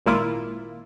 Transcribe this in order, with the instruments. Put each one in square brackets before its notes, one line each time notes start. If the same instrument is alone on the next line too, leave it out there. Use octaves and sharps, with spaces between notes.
[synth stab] G#1 A#2 A#3 E4 F4